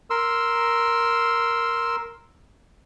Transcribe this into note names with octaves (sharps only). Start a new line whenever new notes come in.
A#4 C6 E6